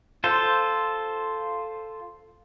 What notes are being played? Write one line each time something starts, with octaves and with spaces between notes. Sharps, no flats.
F4 A4 C5